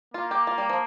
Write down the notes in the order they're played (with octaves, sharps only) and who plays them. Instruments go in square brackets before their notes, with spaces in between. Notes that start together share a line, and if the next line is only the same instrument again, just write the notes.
[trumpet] A#3 [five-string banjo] F4
[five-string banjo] G4
F4
G3
F3